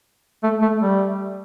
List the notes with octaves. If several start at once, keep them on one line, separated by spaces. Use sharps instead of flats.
A3
A3
G3